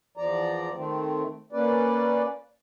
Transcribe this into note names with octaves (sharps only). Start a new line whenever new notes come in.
E2 F3 D5 A#5
D#3 A3 C4
A#3 C#4 B4 D5